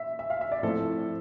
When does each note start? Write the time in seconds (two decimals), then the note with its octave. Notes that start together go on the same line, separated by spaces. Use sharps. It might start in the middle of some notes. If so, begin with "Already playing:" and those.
Already playing: E5
0.19 E5
0.30 F5
0.41 E5
0.52 D5
0.63 A2 F3 A3 C4 A4